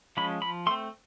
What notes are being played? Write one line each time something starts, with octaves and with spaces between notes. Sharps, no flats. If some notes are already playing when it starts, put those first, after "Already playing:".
F3 G#3 C#4 B5
F3 B5
A3 C4 C6